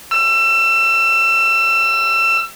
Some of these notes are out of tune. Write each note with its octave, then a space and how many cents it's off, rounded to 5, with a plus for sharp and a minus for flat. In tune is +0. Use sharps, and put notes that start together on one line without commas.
E6 +30